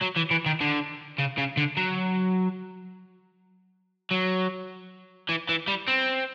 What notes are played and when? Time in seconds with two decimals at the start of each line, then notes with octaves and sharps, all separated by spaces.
0.01 F#3
0.16 E3
0.31 E3
0.46 D#3
0.61 D3
1.19 C#3
1.38 C#3
1.57 D3
1.77 F#3
4.11 F#3
5.29 E3
5.49 E3
5.68 G3
5.88 C4